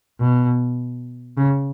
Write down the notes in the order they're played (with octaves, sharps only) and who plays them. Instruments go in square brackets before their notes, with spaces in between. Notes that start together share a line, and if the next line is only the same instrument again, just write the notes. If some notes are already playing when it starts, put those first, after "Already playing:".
[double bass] B2
C#3